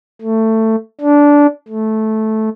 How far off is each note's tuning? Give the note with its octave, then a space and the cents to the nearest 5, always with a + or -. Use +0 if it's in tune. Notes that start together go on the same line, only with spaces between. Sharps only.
A3 +15
D4 -15
A3 -10